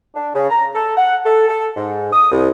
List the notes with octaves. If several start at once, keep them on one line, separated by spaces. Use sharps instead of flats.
D4
C#3
A#5
A4
F#5
A4
A4
G#2
D#6
C2